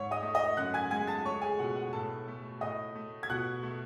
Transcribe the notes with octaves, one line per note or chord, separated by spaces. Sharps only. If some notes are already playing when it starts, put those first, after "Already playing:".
Already playing: G#2 C#5 C#6
D#5 D#6
A3
D#5 D#6
F#2 F#5 F#6
G#5 G#6
G#3 G#5 G#6
A5 A6
A3 C#5 C#6
G#4 G#5
B2 F#5
F#5
A2 A4 A5
A3
A2 D#5 D#6
A3
G#6
B2 F#5 F#6
A3